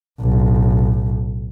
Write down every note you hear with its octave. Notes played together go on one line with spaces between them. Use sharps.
B1 A2